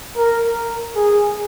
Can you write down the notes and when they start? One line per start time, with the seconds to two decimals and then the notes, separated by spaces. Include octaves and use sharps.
0.17 A#4
0.96 G#4